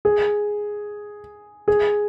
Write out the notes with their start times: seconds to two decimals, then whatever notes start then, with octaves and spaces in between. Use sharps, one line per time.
0.05 G#4
1.68 G#4